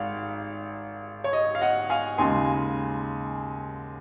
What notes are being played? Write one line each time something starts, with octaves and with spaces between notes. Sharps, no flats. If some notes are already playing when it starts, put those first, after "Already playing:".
Already playing: G#1 F5
C#5
D#5
F5
D#5 F#5
F5 G#5
D#2 C#3 G#3 G#5 C6